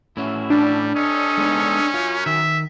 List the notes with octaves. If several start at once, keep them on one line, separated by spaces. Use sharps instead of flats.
A2 C#4 E4 F#4 E5
G3 D4
C3 C#4 A4 D#5
G#3 B3 D#4
F#2 F4
D#3 E5